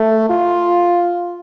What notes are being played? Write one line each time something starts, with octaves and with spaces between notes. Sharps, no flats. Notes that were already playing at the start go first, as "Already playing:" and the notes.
Already playing: A3
F4